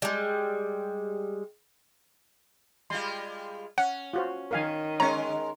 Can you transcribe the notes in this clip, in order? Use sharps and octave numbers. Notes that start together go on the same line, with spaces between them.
G3 G#3
G3 G#3 F4 C6
C#4 F#5
F4 F#4 C5
D#3 A#4 F5 G#5
G#3 C#4 A#4 C#5 A#5